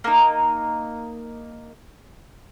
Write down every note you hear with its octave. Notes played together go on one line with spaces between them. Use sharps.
A#3 D#4